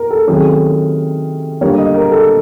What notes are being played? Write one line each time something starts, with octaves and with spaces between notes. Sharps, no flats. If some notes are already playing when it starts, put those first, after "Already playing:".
Already playing: A#4
A4
C3 D#3 F#3 A3 C#4 G#4
D3 G3 A#3 C#5
D#5
A#4
A4